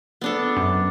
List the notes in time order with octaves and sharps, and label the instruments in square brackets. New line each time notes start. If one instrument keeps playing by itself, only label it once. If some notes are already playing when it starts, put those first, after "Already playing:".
[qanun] B3 D4 A4
[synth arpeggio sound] F#2